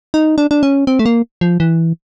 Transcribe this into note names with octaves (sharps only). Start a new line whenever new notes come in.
D#4
D4
D4
C#4
C4
A3
A#3
F3
E3